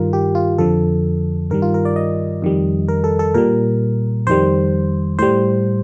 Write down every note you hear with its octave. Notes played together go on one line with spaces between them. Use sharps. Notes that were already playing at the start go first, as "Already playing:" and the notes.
Already playing: G2 D#3 G3 F4 A#4
G4
F4
F2 D3 F3 A4
G2 D#3 G3 A#4
F4
A#4
D5
D#5
F2 D#3 G3
A#4
A4
A4
A#2 G3 A#4
F2 D#3 G3 C5
A2 G3 C5